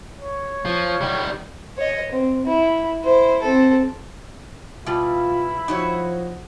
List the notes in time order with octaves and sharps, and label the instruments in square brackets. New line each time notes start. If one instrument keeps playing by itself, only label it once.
[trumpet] C#5
[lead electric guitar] F3
D#3 G3
[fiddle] C#5 D#5
C4
E4
E4 C5
C4 A4
[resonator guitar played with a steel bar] B2 G3 [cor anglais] E4 [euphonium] F4
[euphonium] F3 [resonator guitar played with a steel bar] D#4 F#4 C#5